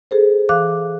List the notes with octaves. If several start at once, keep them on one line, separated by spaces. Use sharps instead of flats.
G#4 A4 C5
E3 F5 D6 F#6